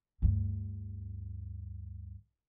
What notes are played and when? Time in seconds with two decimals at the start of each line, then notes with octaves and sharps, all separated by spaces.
0.22 D2 G2